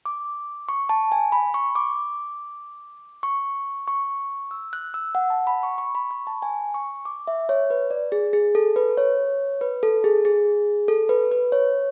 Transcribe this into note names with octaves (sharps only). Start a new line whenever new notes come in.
D6
C#6
A5
G#5
B5
C#6
D6
C#6
C#6
E6
F#6
E6
F#5
A5
B5
C#6
C#6
B5
C#6
A5
G#5
C#6
D6
E5
C#5
B4
D5
G#4
G#4
A4
B4
C#5
B4
A4
G#4
G#4
A4
B4
B4
C#5